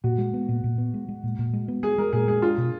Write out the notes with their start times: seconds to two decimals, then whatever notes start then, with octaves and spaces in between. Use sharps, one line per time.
0.04 A#2 F#4
0.18 G#3
0.34 B3
0.48 A#2
0.64 A#2
0.78 B3
0.94 G#3
1.09 G#3
1.23 A#2
1.39 A#2
1.53 G#3
1.68 B3
1.83 G#3 G#4
1.98 G#3 A#4
2.13 A#2 G#4
2.28 G#3 G#4
2.42 D4 F4
2.58 B2